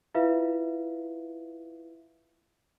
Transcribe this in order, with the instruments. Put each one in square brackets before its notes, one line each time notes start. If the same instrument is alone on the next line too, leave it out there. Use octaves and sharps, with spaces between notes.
[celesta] E4 F4 B4 E5 F5